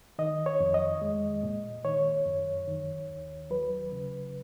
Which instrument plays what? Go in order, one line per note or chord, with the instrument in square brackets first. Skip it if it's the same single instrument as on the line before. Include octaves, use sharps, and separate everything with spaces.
[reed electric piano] D#3 D#5
C#5
F2
D#5
G#3
A#2
D#3 C#5
F#2
D#3
D#2
F#3 B4
C#3